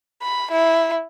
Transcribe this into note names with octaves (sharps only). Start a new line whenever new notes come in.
B5
E4